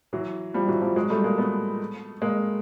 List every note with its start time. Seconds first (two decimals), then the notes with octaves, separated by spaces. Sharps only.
0.13 E3 F#3
0.54 F3 G3
0.68 E3 F#3
0.82 F3 G3
0.96 F#3 G#3
1.10 G3 A3
1.24 G#3 A#3
1.38 A3 B3
2.22 G#3 A#3